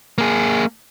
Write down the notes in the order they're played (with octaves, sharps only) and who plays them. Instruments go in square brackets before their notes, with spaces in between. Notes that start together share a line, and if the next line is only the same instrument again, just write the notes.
[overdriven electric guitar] A#3 G#4